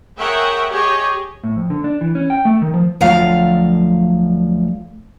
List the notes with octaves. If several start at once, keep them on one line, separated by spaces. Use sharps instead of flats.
G#4 A#4 C#5 E5 F#5 G5
G4 G#4 C#5 D#5
A2
F2
D3
D4
E3
C#4
G5
A3
D#3
F3
D2 F3 F#3 A3 F5 A#5